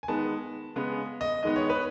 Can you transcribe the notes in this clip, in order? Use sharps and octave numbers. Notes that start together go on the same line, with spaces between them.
G#5
D#3 G#3 B3 A5
C#3 G#3 B3
D#5
D#3 G#3 B3 D#5
C#5
B4